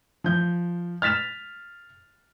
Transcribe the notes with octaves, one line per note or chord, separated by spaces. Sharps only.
F3 G6
F6 A6 B6 E7 F7